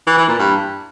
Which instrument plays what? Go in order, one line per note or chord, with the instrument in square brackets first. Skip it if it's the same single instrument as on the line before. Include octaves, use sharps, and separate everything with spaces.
[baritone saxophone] E3
E3
A#2
G2